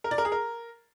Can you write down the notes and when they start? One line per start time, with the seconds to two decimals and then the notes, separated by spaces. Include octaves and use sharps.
0.04 A#4
0.11 D5
0.18 A#4
0.25 G#4
0.32 A#4